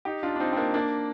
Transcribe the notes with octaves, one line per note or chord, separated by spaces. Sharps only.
D#4 G4
D4 F4
D4
C4 D#4
C4
A#3 D4
A#3 D4